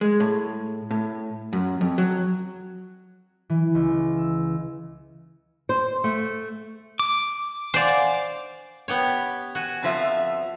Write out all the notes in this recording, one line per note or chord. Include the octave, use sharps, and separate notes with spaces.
G#3
A2
A2
F#2
F2
F#3
E3
C#2
E6
C5
A3
D6
C5 D5 F5 F#5 G#5
B3 G4 C#5
F#4 G#5
F2 F3 E5